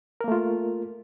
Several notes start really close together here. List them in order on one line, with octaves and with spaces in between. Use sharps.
A#4 A#3 A3 F4